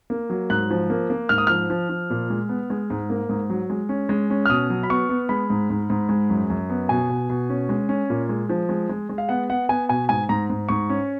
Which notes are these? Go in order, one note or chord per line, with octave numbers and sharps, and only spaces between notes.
A#3
F#3
G#2 F#6
F3
A#3
A#3
G#2 F6
D#6
F3 F6
F3
F3
A#2
G#3
B3
G#3
G#2
A#3
G#2
F#3
G#3
C#4
G#3
C#4
F6
B2 D#6
F#3
B5
B3 C#6
B3
G#3 B5
G#2
G#2
G#2
G#3
F#2
F#2
B3
B2 G#5
B2
B2
C#4
G#3
C#4
A#2
G#3
F3
G#3
G#3
G#3
F5
B3 F#5
B3 F#5
B3 G#5
B2 G#5
G#2 G#5
G#2 A#5
G#2
G#2 C#6
C#4